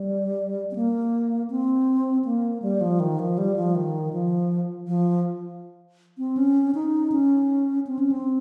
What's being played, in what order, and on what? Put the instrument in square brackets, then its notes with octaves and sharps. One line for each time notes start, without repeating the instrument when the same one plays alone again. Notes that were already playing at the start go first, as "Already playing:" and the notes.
Already playing: [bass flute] G3
C4
A#3
C4
A#3
G3
F3
D#3
F3
G3
F3
D#3
F3
F3
C4
C#4
D#4
C#4
C4
C#4
C4